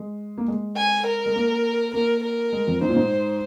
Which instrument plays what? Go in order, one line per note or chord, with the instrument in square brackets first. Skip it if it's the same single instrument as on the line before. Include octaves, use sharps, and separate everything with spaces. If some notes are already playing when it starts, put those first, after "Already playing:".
Already playing: [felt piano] G#3
A#3
G#3
[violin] G#5
A#4
[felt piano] G#3
A#3
[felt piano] A#3 [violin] A#4
[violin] A#4
[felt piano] G#3
F2
[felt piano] G#2 [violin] C5
[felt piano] A#2
G#2